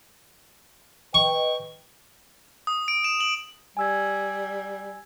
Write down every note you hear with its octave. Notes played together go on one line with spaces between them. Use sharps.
B4 D#5 G5 C#6
D#6
D7
E7
F#7
G3 G#5 E6 G#6